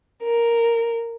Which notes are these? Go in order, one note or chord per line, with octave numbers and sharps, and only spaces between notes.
A#4